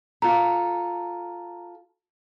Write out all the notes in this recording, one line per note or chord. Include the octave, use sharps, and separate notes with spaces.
F4 A4 A#5